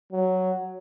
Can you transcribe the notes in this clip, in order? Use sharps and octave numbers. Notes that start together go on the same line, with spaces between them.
F#3